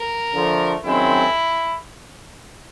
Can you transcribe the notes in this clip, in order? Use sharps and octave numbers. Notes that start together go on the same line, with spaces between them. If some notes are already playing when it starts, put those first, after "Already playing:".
Already playing: A#4
D3 F3 A3
F#2 D#3 G#3 C4 E4